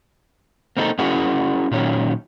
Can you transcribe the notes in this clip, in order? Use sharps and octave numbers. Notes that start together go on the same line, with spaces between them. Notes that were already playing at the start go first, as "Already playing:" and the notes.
A#3 C4 D#4 F#4 A4
C#4 E4 F#4 G#4 A#4
A#2 D#3 F#3 C#4